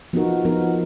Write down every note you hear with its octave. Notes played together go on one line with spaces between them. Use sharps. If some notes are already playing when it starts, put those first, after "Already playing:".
F3 B3 D#4 F#4 A#4
F3 B3 D#4 F#4 A#4